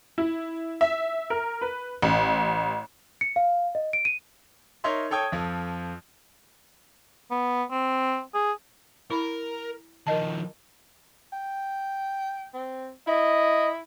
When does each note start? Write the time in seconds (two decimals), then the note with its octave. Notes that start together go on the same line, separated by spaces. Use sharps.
0.18 E4
0.81 E5
1.30 A#4
1.61 B4
2.02 A1
3.21 C#7
3.36 F5
3.75 D#5
3.93 D7
4.05 D#7
4.84 D#4 A#4 C#5 E5 C6
5.11 A4 C#5 G5 D#6 G#6
5.32 F2 F3 A4
7.31 B3
7.71 C4
8.34 G#4
9.10 E4 A#4 B5
10.07 D#3 F3 A#4 D#5 A5
11.33 G5
12.54 C4
13.08 E4 D#5